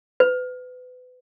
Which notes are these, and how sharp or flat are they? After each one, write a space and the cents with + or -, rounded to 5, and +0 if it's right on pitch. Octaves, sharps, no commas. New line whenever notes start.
B4 +30